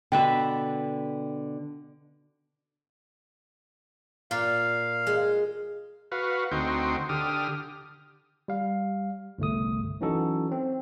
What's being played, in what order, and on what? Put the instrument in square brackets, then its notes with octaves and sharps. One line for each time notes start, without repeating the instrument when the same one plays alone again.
[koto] B2 B4 E5 [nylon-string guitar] D3 [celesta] G5
[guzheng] A#2 [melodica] F5
[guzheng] G#3
[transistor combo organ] F#4 B4 F5
D2 C4 D#4 F#4 G5 C6
D3 G4 D#6 F6
[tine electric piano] G3 F5
G1 C2 A3 D#6
E3 F#3 C#4 D#4 F#4 A4
C4